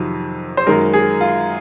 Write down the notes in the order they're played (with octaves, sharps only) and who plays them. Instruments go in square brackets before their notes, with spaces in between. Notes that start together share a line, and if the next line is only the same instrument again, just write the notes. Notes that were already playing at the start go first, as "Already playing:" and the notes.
Already playing: [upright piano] F2 C3 D#3 F#3
C5
F#2 D#3 G#3 A#4
G#4
F4